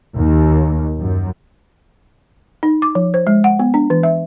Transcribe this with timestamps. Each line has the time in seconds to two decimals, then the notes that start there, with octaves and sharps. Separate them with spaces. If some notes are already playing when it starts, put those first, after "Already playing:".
0.15 D#2
0.99 F#2
2.63 D#4
2.82 D6
2.95 F3
3.14 C5
3.27 G#3
3.44 F#5
3.59 B3
3.74 D4
3.90 E3
4.03 E5